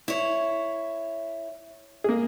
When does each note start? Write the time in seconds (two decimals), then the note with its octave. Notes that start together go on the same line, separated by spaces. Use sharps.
0.08 E4 C#5
2.04 A#3 G#4